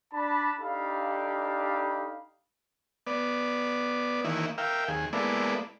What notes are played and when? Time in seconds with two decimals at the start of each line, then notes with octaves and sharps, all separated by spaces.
0.13 D4 A5 B5
0.59 D4 D#4 G4 A4 F5 B5
3.07 B3 D5
4.25 D#3 E3 A#3 E4
4.58 A#4 E5 F5 G5
4.88 D#2 G#4
5.13 G#3 A#3 B3 E4 A4 D5